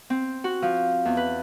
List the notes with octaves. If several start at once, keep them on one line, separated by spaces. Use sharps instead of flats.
C4
F#4
F3
E2
B4